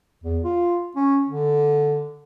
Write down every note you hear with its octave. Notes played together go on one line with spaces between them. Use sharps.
E2
F4
C#4
D3